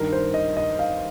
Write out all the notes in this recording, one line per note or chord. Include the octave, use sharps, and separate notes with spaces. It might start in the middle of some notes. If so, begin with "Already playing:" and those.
Already playing: G2 D#3 A#4
C5
D#5
D#5
F5